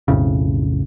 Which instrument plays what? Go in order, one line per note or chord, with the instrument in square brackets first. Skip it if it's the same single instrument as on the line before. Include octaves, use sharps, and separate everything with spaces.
[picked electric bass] B1 F2 A2 C#3